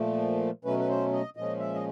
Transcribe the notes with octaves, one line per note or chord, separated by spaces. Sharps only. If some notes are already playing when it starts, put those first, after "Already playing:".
Already playing: A#2 F3 A3
B2 F#3 A3 C#4 B4
B4
C5
D#5
A#2 F3 G#3 C#4 D#5
E5
D#5